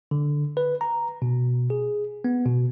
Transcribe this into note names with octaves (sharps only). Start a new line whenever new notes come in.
D3
B4
A#5
B2
G#4
B3
B2